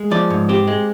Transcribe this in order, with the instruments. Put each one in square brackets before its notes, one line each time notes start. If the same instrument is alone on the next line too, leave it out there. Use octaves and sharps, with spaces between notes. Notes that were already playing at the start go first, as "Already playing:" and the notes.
Already playing: [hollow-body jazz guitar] G#3
F3 D5
G#2
C4 G4
G#3